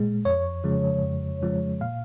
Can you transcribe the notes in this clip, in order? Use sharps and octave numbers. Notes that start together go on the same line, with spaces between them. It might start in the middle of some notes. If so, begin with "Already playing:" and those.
Already playing: A#2 G#3
F2 C#5
C#3 F3 G#3
F2
C#3 F3 G#3
A#2 F5